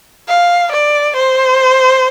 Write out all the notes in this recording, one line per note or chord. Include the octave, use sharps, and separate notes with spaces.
F5
D5
C5